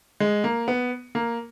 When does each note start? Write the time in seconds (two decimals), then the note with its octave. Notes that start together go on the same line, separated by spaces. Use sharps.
0.20 G#3
0.44 A#3
0.68 B3
1.15 A#3